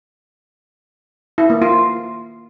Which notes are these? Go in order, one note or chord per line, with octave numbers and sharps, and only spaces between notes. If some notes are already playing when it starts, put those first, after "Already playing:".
E4
A#3
F4